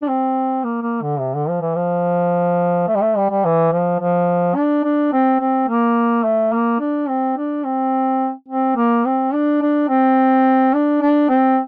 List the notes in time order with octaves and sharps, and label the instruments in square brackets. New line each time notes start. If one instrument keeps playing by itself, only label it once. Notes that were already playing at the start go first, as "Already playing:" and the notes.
[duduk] D4
C4
A#3
A#3
D3
C3
D3
F3
E3
F3
A3
G3
A3
G3
G3
E3
F3
F3
D4
D4
C4
C4
A#3
A3
A#3
D4
C4
D4
C4
C4
A#3
C4
D4
D4
C4
D4
D4
C4